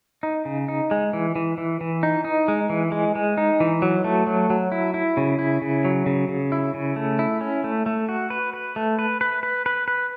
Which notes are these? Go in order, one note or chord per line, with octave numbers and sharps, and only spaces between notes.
D#4
C#3
D#4
G#3
E3
E3
E3
E3
D#4
D#4
G#3
E3
G#3
G#3
D#4
E3
F#3
A3
F#3
F#3
E4
E4
C#3
E4
C#3
F#3
C#3
C#3
E4
C#3
A3
E4
C#4
A3
A3
F#4
B4
B4
A3
B4
B4
B4
B4
B4